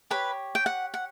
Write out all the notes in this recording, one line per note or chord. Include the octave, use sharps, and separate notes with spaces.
G4 B4 C#5 B5
G5
F#5
F#5